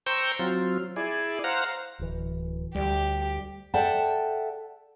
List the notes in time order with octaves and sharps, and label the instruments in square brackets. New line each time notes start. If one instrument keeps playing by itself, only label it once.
[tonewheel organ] C5 G5 A#5 C#6 E6 G6
F#3 C4 F4
E4 G#4 D5
C5 F5 F#5 A#5
[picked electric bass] D1 E3
[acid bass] D2 [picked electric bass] G3 [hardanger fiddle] G4
[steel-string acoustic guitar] A4 D5 E5 F#5 G5 A5